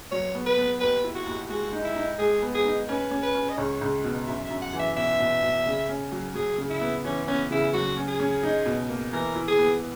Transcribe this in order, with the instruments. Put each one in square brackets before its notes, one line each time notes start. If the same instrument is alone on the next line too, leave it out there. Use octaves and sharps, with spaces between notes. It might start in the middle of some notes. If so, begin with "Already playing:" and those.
[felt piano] F#3 [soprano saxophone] C#5
[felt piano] B3
[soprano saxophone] B4
[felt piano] B3
[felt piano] D#2 [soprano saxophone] B4
[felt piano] E4
[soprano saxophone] F#4
[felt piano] D#2
[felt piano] G#3 [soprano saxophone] F#4
[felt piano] D#4
[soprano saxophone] E4
[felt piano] D#4
[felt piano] G#3 [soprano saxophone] G#4
[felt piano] B3
[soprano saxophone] G#4
[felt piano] D#4
[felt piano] C#4 [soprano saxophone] B4
[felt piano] C#4
[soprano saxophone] B4
[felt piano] C#4
[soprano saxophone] D#5
[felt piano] C#2 [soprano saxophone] C#5
[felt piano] C#2
B2
[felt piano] F#2 [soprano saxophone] E5
[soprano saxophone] E5
[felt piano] F#2
[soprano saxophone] F#5
[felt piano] E3
[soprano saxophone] E5
[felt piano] B2 [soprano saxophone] E5
[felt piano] B2
B2
C#3
C#4
F#3
[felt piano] F#3 [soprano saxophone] G#4
[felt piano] C#3
[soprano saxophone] E4
[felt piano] B3
[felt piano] E3 [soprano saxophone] C#4
[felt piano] B3 [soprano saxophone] C#4
[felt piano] C#3 [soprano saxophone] E4
[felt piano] F#3 [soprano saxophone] F#4
[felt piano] C#4
[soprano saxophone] G#4
[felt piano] C#4
D#4
B2
A#3
[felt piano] E3 [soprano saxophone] A#4
[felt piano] E4
[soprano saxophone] G#4
[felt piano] B3